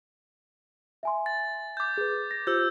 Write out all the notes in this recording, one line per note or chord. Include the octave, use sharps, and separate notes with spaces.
E5 G#5 C6
A6
D6 G6
G#4 B4
A#6
F4 G4 C5 E6 G6